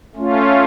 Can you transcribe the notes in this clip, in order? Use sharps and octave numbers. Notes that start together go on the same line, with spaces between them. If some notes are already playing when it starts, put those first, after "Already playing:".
A3 C#4 F4